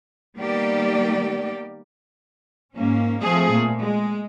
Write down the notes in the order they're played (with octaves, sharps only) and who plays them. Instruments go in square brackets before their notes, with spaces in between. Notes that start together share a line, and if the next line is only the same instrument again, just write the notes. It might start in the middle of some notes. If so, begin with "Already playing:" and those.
[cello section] D#3 G3 A#3 B3 G4 D5
G#2 A#3 C#4
F3 A3 C4 G#4
A#2
G#3